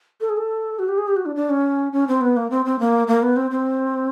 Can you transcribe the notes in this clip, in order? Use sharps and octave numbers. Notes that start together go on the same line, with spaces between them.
A4
G#4
A4
F#4
G4
G#4
G4
F#4
D4
D4
C#4
C#4
C4
B3
A#3
C4
C4
A#3
A#3
B3
C4
C4